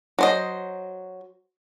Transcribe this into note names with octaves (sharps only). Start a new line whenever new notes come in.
F#3 C5 D#5